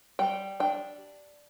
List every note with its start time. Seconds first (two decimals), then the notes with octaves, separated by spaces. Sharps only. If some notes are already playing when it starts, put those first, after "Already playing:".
0.19 G3 G5
0.60 D4 G5